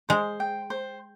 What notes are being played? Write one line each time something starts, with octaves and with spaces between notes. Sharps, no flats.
G#3 C5
G5
C5